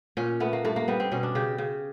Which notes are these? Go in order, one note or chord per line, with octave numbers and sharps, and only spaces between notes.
A#2 C#4
A3 B3
A#3
G2 A3
A#3
G3 B3
C4
B2 C#4
D4
C#3 G4
C#3